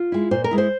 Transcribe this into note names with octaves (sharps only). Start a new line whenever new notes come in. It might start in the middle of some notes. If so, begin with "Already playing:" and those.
Already playing: F4
G#3 E4
A#2 C5
A#4
G#3 E4
C5